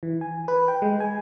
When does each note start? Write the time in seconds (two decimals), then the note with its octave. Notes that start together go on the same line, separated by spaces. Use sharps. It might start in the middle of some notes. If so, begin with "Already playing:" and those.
0.03 E3
0.21 G#5
0.48 B4
0.68 G5
0.82 G#3
1.00 G#5